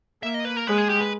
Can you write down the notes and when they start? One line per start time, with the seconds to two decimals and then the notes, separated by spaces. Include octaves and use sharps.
0.23 A#3 E5
0.34 D#5
0.45 B4
0.56 A#4
0.67 G#3 B4
0.78 G#4
0.89 G4
1.01 B4